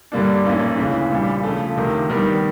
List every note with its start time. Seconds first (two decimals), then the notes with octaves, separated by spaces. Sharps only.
0.12 G2 D3 G3 A#3 D4
0.45 B1 A#2 F3 A#3 C#4
0.77 D2 C#3 E3
1.11 A#1 A#2 G3
1.44 C#3 F3 A3
1.76 D2 C3 D#3
2.10 D#3 G3 B3